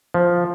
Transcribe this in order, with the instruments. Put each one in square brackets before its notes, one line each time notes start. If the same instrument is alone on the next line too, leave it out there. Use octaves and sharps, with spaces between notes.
[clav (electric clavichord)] F3